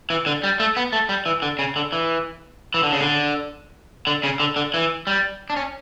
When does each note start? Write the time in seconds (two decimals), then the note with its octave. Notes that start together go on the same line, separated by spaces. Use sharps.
0.10 E3
0.26 D3
0.44 G3
0.60 A3
0.77 B3
0.93 A3
1.09 G3
1.26 E3
1.42 D3
1.59 C#3
1.76 D3
1.92 E3
2.74 E3
2.83 D3
2.93 C#3
3.01 D3
4.07 D3
4.23 C#3
4.40 D3
4.56 D3
4.74 E3
5.07 G3
5.50 D4
5.56 C#4